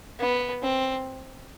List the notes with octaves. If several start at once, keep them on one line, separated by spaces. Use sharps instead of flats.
B3
C4